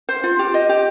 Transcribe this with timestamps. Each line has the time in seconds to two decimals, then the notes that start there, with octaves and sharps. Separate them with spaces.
0.09 C5
0.24 F4
0.39 G4
0.54 D#5
0.69 G4